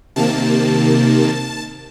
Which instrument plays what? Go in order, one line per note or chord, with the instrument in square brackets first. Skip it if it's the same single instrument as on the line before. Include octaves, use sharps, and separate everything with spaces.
[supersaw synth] C3 D#3 A#3 A5